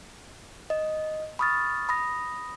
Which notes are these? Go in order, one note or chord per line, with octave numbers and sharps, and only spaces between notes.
D#5
B5 C#6 D#6 F6 A6
B5 D#6 A#6